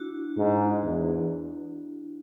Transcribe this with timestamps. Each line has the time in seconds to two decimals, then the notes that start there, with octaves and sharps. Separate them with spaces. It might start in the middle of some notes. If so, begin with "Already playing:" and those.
Already playing: D4 E4 F#4
0.37 G#2
0.82 E2